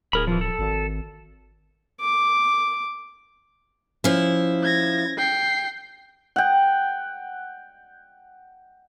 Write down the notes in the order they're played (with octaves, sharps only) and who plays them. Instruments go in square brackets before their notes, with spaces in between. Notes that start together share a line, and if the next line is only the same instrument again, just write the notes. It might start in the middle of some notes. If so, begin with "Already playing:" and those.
[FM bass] D1 [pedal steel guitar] G#4 A#4 B5
[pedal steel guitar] E3 F3
A4
[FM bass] G#1
[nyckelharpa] D6
[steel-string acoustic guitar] F3 E4 [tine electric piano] C#4
[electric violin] G#6 A#6
G5 C7
[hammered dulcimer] F#5 G5